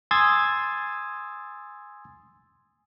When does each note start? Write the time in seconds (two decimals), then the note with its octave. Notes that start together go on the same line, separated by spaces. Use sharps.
0.11 G#5 C6 D#6 E6 G#6 A6